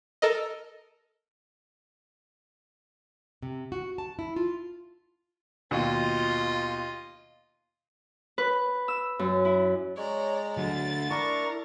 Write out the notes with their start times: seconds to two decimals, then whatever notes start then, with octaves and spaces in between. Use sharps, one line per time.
0.22 A4 A#4 D#5
3.42 C3
3.72 F#4
3.98 A5
4.19 E4
4.36 F4
5.71 D#2 B2 F4 D#5
8.38 B4
8.88 E6
9.19 F#2
9.45 E4
9.97 G#3 C#5 D5 A#5
10.57 D3 F#3 A3 A6
11.10 D4 E4 A#4 C#6